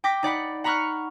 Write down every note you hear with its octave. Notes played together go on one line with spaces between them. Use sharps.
G5 D6 A#6 B6
D#4 D5 F#5 B5
F#5 A#5 B5 C#6 F6 F#6